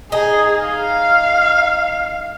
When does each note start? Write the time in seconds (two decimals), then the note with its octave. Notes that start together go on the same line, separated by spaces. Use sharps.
0.12 D#4 G#4
0.66 F5